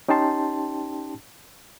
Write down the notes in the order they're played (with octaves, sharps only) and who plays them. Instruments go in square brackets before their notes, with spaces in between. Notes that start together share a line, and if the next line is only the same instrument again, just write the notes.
[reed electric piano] C#4 D#4 G4 G5 A5 C6